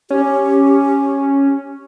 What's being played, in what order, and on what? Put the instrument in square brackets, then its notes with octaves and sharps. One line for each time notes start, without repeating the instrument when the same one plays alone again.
[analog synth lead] C#4 [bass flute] G4